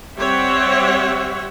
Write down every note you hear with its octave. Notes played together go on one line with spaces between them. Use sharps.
G3 C4 G4 C#5 E5 F#5